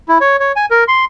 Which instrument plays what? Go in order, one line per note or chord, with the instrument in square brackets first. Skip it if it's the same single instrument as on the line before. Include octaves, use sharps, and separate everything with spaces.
[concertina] E4
C#5
C#5
G#5
A#4
C6